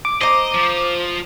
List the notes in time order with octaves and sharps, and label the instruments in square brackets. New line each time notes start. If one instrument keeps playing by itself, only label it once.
[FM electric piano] D6
[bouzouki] C5 A#5 [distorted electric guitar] D#5
[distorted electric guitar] F3